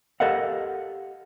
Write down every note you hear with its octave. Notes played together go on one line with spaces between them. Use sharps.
G4 A4 A#4 D#5 F5 F#5